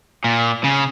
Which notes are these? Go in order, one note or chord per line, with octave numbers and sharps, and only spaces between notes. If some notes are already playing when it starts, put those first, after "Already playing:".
A#2
C#3